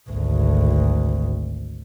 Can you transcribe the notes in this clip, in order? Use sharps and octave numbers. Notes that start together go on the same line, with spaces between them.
G#1 D2